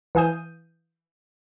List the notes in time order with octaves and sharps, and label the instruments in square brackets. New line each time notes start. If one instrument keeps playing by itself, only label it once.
[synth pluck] E3 F5 G#5 D#6 G6 D#7